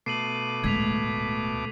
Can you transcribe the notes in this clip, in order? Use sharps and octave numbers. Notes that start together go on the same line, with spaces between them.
B2 A3 D6 C7 D#7 F#7
D1 G#3 G#6 B6 F7